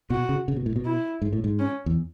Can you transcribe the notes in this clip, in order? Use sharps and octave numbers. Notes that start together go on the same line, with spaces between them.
B2 F#4
C#3
C#3
B2
A2
B2
E4
G#2
A2
G#2
C#4
E2